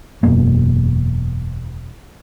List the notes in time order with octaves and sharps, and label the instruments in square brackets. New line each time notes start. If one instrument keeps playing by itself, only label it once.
[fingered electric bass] E1 F#2 B2 A#3